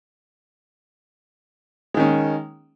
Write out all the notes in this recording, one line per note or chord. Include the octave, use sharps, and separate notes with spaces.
D#3 G#3 C#4